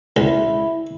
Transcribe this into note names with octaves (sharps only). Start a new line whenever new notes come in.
C#2 E4